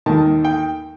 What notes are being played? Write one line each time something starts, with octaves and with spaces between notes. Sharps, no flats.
D#2 D#3 A5
G5